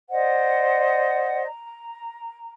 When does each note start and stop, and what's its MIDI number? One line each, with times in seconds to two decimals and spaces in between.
0.10 1.46 72
0.10 1.46 74
0.10 1.46 75
0.10 1.46 78
1.47 2.52 82